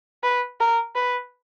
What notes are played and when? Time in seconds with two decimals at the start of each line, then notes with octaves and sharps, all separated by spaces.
0.23 B4
0.60 A#4
0.96 B4